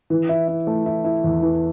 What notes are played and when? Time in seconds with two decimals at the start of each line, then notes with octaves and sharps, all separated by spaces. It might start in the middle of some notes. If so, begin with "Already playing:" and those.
0.10 E3
0.29 E4
0.48 E4
0.67 A3
0.86 E4
1.04 E4
1.24 E2
1.42 E3